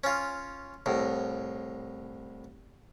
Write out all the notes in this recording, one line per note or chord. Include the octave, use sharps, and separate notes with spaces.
C#4 F4
C2 A2